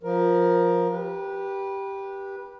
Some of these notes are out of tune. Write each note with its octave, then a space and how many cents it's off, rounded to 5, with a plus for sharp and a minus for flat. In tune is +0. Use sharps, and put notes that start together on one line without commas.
F3 +10 A#4 +15
G4 +0 B4 -25